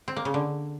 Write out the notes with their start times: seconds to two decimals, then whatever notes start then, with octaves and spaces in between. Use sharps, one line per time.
0.08 C4
0.16 A#3
0.25 C#3
0.34 D3